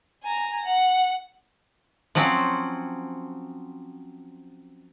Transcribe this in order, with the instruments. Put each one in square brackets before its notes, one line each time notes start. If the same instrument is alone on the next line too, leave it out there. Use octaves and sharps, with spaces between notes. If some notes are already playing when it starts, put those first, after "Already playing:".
[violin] G#5 A#5
F#5
[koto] F3 F#3 C4 C#4